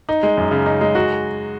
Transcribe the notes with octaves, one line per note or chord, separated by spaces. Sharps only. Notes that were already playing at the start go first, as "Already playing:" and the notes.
D#4
G#3
F#2
C#3
D#4
G#3
F#4